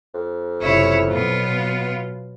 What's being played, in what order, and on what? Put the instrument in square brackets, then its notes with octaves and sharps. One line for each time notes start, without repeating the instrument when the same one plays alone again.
[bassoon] F2
[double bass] F#1 C3 [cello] E4 C#5
[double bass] B2 F#3 [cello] B3 F4